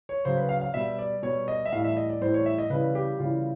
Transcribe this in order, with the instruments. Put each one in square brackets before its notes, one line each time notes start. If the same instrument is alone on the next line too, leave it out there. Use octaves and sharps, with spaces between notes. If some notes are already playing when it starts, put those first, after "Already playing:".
[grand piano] C#5
C#3 F#3 C5
B4
F5
F5
B2 G3 E5
D5
B2 G3 C#5
D#5
E5
A2 E3 G3 F5
E5
D#5
D5
A2 E3 G3 C5
C#5
E5
D#5
C#3 E3 G3 B4
G4
C#3 E3 G3 F4